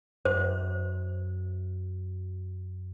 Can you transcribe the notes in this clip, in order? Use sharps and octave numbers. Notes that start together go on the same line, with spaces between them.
F#2 C5